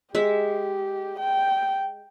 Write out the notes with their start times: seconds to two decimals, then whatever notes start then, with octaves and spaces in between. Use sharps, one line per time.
0.15 G#3 G4 E5
1.20 G5